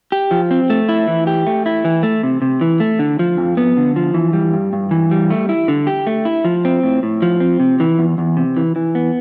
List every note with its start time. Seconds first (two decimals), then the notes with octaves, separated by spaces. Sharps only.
0.12 G4
0.31 F3
0.51 C4
0.70 A3
0.89 E4
1.08 E3
1.27 G4
1.47 A3
1.66 E4
1.85 E3
2.03 A3
2.23 C3
2.42 C3
2.61 E3
2.80 A3
2.99 D3
3.19 F3
3.37 F2
3.57 B3
3.77 D3
3.96 F3
4.14 E3
4.33 G3
4.53 G2
4.73 G2
4.91 E3
5.11 G3
5.30 A3
5.49 E4
5.68 D3
5.87 G4
6.07 A3
6.25 E4
6.45 F3
6.65 C4
6.83 A2
7.03 A2
7.22 F3
7.40 C4
7.60 C3
7.80 E3
7.99 E2
8.18 E2
8.37 C3
8.57 E3
8.76 E3
8.95 B3